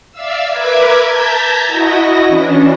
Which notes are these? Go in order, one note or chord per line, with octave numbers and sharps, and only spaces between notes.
D5 E5 F5 E6
A#4 B4 E5 D6 G#6
A5 A#5 G6 G#6 B6
E4 F#4 D#5 A#6
E3 C#4 D4